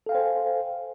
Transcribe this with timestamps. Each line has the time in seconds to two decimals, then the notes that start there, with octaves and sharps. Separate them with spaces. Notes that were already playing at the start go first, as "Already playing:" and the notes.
0.06 A4
0.09 F5
0.12 G5
0.15 C5
0.17 G#5